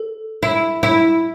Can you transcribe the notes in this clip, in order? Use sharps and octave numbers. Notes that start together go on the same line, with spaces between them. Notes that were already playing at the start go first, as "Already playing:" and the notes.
Already playing: A4
E4
E4